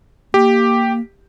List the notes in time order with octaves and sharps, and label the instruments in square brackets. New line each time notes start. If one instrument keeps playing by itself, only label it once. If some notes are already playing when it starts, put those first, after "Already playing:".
[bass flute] A#3 [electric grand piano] G4